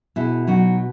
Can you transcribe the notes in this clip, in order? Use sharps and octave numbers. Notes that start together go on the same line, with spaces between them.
B2 E4 G#4
F#3 D#4 F#4